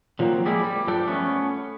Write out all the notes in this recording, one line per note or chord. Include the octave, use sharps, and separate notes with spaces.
D3 F3 F#3 A#3 C4
G3 G#3 A#3 E4 G#4 D5
G3
G2 F3 D4 A4 G5
A3 B3 C#4